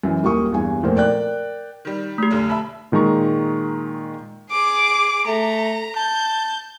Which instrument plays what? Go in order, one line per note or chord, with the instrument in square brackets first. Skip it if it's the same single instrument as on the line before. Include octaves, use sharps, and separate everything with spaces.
[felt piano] F#2 E3
D#1 A#3 G4 C#6 D#6
E2 G2 G#5
F1 A#2 A#4 C5
A#4 D5 G5 F#6
[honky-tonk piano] D#3 G3
[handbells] A3 G4
[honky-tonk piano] F1 B1 D3
E5 A5 B5
[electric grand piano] A#2 D#3 G#3 A#5 C#6
[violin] G#4 D6
[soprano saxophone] A3 [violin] A#5
[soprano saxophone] A5 [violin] G6